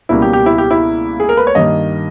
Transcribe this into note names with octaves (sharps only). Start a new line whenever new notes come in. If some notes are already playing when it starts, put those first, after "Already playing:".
C#2 B2 G3 A#3 E4
G4
G4
E4
G4
E4
G#4
A#4
B4
C#5
G2 D#3 A#3 D#5